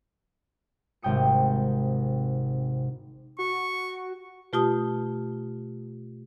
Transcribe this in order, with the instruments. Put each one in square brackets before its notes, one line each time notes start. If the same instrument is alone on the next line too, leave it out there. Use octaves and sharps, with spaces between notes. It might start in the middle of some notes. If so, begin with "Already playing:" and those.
[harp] G#1 C3 G5 D#6 C#7
[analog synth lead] F#4 [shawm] C#6
[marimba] B2 A3 F4 G4 A5 D#6